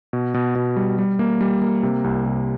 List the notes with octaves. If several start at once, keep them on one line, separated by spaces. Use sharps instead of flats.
B2
B2
B2
G3
G3
A#3
G3
A#3
C3
C2
C2